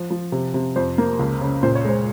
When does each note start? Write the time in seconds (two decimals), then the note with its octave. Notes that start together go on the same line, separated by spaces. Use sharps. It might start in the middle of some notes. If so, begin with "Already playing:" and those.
Already playing: F3
0.11 F3
0.32 C3
0.54 C3
0.76 F2 C5
0.98 A#3
1.19 C#2
1.41 C#3
1.63 A#2 C5
1.75 C#5
1.85 G#3 C5